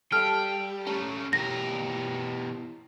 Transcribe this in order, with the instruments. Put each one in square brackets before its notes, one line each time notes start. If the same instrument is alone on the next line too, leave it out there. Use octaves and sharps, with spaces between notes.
[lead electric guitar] G3 [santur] A4 F5 [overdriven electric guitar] G5 [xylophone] F6
[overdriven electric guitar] A3 C#4 [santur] A#5
[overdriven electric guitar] B2 A#4 [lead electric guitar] E3 G4 [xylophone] A#6